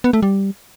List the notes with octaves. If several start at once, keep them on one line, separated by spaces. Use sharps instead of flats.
B3
A3
G3